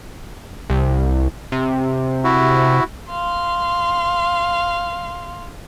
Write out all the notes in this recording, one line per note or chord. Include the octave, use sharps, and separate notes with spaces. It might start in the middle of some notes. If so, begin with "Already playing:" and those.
C2
C3
E4 F#4
F5 C6